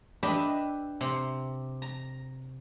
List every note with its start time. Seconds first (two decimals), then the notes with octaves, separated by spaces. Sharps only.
0.23 D4 G4 B4 D#5 E5
1.01 C3
1.82 A#5